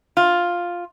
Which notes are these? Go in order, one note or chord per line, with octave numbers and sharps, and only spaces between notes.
F4